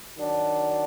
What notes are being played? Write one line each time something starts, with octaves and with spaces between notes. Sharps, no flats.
D#3 F#3 D4